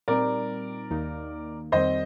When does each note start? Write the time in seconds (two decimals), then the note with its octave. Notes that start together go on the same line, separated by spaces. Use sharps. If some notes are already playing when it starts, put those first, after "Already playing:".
0.08 A#2 G3 C4 D#4 A#4 D5
0.90 D#2 D#3 A#3 D#4
1.72 F2 D#3 G3 C4 C5 D#5